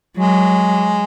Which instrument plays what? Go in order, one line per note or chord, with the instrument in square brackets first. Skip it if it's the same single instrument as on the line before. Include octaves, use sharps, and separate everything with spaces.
[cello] F#3 [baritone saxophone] G#3